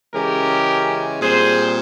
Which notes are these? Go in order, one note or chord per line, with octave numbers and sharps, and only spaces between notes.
C#3 E3 G#3 C#4 G4 A#4
A#2 G3 C4 G#4 C5